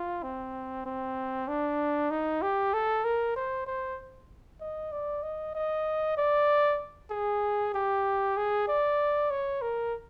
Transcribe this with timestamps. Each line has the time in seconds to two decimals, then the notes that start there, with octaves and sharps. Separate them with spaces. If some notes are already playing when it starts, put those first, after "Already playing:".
Already playing: F4
0.23 C4
0.86 C4
1.48 D4
2.10 D#4
2.42 G4
2.74 A4
3.04 A#4
3.36 C5
3.67 C5
4.61 D#5
4.92 D5
5.23 D#5
5.55 D#5
6.17 D5
7.11 G#4
7.74 G4
8.37 G#4
8.68 D5
9.30 C#5
9.62 A#4